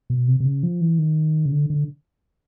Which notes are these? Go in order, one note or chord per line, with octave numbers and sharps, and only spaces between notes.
B2
C3
C3
C#3
F3
E3
D#3
C#3
D3
D3